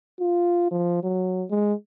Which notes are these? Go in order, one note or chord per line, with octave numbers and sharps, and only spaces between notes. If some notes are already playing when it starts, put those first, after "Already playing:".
F4
F3
F#3
G#3